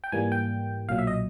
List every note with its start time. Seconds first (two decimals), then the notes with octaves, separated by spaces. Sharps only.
0.04 G5
0.12 G#2 E3 G3 A#3 G#5
0.32 G5
0.89 B1 A#2 F#3 F5
0.98 E5
1.07 D#5